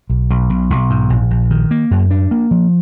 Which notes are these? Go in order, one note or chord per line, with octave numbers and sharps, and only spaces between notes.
B1
B1
B1
B1
G#2
A#1
A#1
D#3
A#3
F#2
D4
A#3
F3